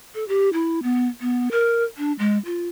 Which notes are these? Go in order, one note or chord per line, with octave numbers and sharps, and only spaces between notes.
A4
G4
E4
B3
B3
A#4
D4
G#3
F4